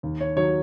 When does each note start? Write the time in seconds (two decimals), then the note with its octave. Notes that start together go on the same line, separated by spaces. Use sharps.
0.03 D#2
0.21 C#5
0.36 D#3 F#3 C#5